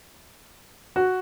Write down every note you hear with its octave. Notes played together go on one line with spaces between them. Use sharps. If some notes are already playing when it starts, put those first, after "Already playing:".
F#4